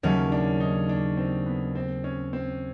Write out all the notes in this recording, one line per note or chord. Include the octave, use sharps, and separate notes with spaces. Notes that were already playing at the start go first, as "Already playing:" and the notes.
D#2 C#3 F#3 A3 C#4
D4
D#4
D4
C4
B3
C4
C#4
C4